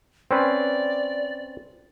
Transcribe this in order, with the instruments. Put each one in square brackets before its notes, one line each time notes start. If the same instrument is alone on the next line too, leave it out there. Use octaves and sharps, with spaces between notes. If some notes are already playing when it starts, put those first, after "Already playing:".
[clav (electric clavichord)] C4 C#4 B4 [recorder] D5